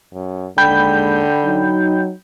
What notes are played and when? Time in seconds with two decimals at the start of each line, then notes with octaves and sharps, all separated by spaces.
0.13 F#2
0.58 D#2 D3 G#3 G5 B5 G6
1.44 F#3 D#4